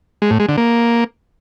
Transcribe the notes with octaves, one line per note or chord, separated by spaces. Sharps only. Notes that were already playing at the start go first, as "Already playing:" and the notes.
G#3
A2
G#3
D3
A#3